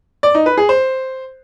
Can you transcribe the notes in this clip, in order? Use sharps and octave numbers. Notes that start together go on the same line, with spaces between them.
D5
D#4
B4
G#4
C5